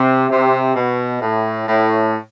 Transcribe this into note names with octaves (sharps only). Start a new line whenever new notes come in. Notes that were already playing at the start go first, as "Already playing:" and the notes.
Already playing: C3
C3
B2
A2
A2